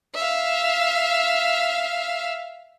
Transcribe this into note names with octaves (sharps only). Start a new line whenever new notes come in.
E5 F5